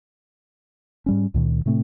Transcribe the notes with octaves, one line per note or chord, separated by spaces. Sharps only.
G#2 G3 C#4
C#2 A#2 D#3
A2 C3 A3 C4